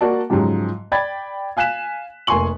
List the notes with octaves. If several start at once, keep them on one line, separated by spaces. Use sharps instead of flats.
A#3 F#4 D5 A5
G#2 C#3 F3 F#3 G4
D5 G5 B5 G#6 A6
F5 G#5 F#6 B6 E7
F1 A#3 G#5 C6 C#6 F#7